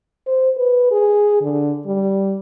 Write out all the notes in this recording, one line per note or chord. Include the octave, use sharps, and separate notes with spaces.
C5
B4
G#4
D3
G3